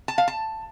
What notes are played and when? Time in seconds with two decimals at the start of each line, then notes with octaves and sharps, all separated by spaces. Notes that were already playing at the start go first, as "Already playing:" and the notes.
0.08 A5
0.18 F5
0.28 A5